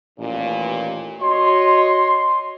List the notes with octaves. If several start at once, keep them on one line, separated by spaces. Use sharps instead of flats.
A1 D#2 A#2
F#4 C#5 D#5 C6